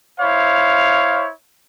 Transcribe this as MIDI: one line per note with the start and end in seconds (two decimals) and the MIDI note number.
0.20 1.28 64
0.20 1.28 72
0.20 1.28 73
0.20 1.28 77